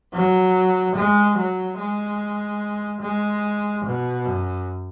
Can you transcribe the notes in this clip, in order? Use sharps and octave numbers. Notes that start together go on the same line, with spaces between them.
F#3
G#3
F#3
G#3
G#3
B2
F#2